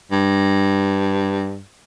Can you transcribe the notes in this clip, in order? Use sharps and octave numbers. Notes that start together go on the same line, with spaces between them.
G2